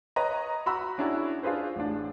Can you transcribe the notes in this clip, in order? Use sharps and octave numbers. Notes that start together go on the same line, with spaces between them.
B4 C#5 D#5 A#5
F#4 A#5 B5 E6
C#4 D4 E4 F#4 G#4
D4 F4 G#4 B4 C5
A1 D4